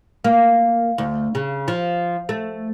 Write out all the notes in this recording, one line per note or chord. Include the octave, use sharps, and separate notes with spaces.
A#3
D2
C#3
F3
A3